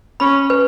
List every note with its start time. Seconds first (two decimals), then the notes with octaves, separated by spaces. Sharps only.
0.20 C#4 B5
0.50 B4